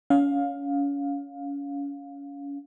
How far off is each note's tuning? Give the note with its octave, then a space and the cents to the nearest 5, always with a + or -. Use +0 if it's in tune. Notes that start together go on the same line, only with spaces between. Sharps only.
C#4 +30 F5 +15